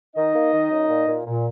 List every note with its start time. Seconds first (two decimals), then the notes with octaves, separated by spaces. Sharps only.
0.15 D#3 D#4 D#5
0.34 A#3
0.52 D#3
0.70 F#2
0.89 A#2
1.07 A#2
1.25 A#2